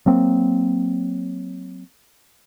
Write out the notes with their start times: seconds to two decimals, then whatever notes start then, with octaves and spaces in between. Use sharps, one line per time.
0.06 F#3 A#3 C4